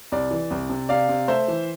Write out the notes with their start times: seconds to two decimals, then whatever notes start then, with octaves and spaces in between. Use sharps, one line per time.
0.12 C2 D5
0.31 E3
0.51 C2
0.70 C3
0.89 C3 D5 F5
1.09 C3
1.28 A3 C5 E5
1.48 E3